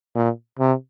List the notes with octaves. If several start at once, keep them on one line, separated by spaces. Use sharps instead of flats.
A#2
C3